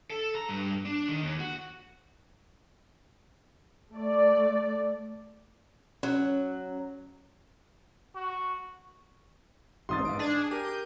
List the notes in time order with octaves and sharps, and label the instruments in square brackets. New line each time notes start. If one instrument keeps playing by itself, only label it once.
[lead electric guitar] A4
A#5
G2
D4
D#3
D#2
F#4
[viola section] A3 D5
[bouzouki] F#3 [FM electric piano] C#4
[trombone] F#4
[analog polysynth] A1 G#2 [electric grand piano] C6 D#6 A6
[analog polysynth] G#2 D7
D4 G#4
[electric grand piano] G4 A#4 [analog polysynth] D#7
[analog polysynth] G6